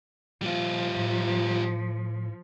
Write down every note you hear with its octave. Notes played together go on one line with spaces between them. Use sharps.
A#2 F3 G3 F4
A2